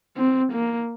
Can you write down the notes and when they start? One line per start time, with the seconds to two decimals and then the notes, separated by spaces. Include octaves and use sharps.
0.17 C4
0.53 A#3